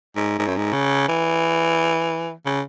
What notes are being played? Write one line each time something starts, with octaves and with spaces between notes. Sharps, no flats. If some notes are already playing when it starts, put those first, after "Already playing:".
G#2
G#2
F#2
G#2
C#3
E3
C#3